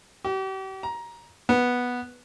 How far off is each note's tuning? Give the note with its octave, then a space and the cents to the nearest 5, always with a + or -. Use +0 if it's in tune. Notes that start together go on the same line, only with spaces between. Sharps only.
G4 -40
A#5 +15
B3 -5